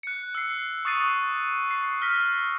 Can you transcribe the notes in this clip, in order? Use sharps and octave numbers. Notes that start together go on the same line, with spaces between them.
F#6 C#7
E6 C7
C#6 D#6 F#6 A6 C7 D#7
C#6
C7
E6 F6 A#6 B6